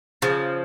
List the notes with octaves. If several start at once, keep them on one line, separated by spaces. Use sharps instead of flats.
C#3 F3